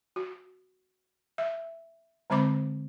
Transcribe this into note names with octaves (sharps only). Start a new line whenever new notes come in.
F#4
E5
D3 G#3 C4 C5 B5 D6